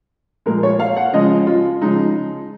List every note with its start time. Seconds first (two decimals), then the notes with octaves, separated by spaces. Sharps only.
0.46 A#2 F3 G#3 A#4
0.63 C#5
0.79 F5
0.97 F#5
1.13 C#3 F3 G#3 D#5
1.47 F4
1.82 C#3 F3 G#3 D#4